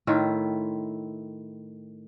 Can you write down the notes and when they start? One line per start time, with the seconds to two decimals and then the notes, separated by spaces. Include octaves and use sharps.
0.07 A2 D#3 E4 F4